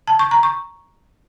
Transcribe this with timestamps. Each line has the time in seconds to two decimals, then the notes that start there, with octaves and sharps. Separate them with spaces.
0.08 A5
0.19 C#6
0.31 A#5
0.43 C#6